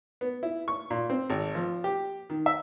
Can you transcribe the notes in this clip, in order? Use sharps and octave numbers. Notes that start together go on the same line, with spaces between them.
B3
E4
C#6
A#2
C4
G#1
F3
G4
D#3
E5